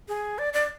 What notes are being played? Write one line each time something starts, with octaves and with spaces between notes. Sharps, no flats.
G#4
D5
D5